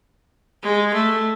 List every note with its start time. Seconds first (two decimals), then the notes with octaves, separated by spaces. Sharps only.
0.63 G#3
0.93 A3